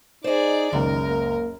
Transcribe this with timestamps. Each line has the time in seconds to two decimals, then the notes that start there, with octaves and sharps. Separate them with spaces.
0.24 D#4 G#4 C5 D5 D#5
0.73 F#1 C#2 F#2 D#3 A#4
1.08 A#3